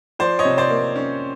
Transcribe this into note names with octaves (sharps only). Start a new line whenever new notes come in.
F3 C5 D5
C#5 D#5
C3
C5 D5
A#3
C#4